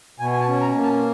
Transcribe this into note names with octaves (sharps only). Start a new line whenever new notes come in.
B2 G#5
G#5
A5
C#4
A#5
A#3
A5